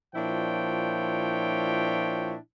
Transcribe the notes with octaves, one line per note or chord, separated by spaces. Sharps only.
A#2 F3 D4 E4 C#5 G5